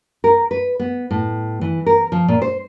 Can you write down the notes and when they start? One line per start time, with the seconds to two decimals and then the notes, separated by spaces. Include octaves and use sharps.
0.24 A#4
0.51 B4
0.80 B3
1.11 A2
1.61 E3
1.86 A#4
2.12 F3
2.28 A#2
2.42 C5